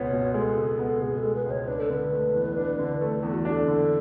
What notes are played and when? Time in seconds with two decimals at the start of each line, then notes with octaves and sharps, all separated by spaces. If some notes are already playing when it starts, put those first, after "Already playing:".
Already playing: C#2 B2 G#3 B3 C#5
0.12 B2
0.34 G#3 A4
0.57 C#2
0.79 B3
1.01 B2 G#4
1.18 A4
1.23 G#3
1.35 B4
1.46 C#2 C#5
1.68 D4 B4
1.79 A4
1.90 D3 B4
2.12 A3
2.34 E2
2.56 D4
2.79 D3
3.01 A3 B4
3.18 A4
3.23 E2
3.34 F#4
3.45 D4
3.51 A4
3.67 D3